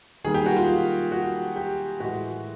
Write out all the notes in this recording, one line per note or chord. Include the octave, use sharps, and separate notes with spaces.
D#3 G3 A#3 G#4
G4
F#4
F4
F#4
G4
A2 E3 G#3 F#4